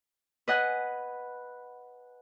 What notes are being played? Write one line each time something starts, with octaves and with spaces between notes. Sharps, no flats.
B4 D#5 F#5 G#5